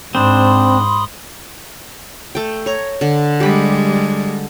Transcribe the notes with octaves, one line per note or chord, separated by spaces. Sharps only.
G#2 C4 D4 B5 C6 D#6
A3 G5
C#5 A#5
D3
G3 G#3 G4 B5